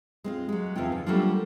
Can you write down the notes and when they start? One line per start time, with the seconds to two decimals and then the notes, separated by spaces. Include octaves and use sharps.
0.24 G#3 C4 F4
0.49 F#3 G#3
0.76 E2 C#3 C4 F4 G5
0.92 F3
1.07 F#3 G3 A3 A#3 D4 F4